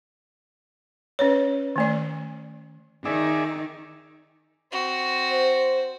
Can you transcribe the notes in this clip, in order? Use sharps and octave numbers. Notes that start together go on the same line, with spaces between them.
C#4 B4 C#5
D#3 A3 D5
D#3 D#4 G#4 D5 E5
C4 F#4
C5